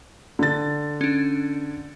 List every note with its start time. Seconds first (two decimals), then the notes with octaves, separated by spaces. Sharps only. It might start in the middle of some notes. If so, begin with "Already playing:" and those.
0.39 D3 A6
1.01 C#4 D4